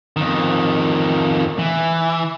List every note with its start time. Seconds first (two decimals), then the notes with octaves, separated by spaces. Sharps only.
0.17 F2 D#3
1.59 E3